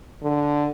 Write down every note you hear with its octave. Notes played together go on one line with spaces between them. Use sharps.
D3